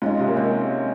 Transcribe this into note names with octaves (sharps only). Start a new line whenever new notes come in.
G#2 G#3 C#4 F4
C3
A#3
G#3 C4 C#4